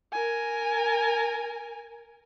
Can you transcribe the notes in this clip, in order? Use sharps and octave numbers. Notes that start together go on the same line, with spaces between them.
A#4 G#5